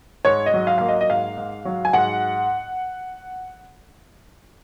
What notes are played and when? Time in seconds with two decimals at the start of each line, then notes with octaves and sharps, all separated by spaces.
0.25 G#2 C#5
0.46 D#5
0.54 F#3
0.67 F5
0.78 A#3 F5
0.88 D#5
1.01 D#5
1.09 G#2 F5
1.37 G#2
1.65 F#3
1.85 G#5
1.93 G#2 F#5